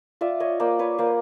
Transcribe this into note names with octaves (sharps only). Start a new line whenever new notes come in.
F4 D5 E5
C#5 D#5
A#3 C5 D5
B4 C#5
A#3 C5 D5